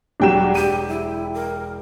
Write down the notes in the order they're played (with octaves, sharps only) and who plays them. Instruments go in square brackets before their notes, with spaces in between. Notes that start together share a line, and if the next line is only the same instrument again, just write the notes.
[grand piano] E1 G5 E7 [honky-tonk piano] F#3 G3 D4
[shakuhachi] G4 [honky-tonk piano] D#7
[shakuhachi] E4
A#4